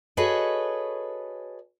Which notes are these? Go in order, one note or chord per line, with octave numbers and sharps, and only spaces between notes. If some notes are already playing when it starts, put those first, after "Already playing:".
F#4 G#4 A4 B4 C#5 D#5